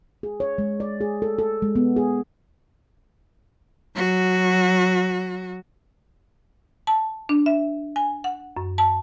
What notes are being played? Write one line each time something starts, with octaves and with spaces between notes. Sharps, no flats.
G#4
C#5
G#3
D5
G#4
A4
A4
G#3
B3
G#4
F#3 F#4
A5
D4
E5
G#5
F#5
F#2
A5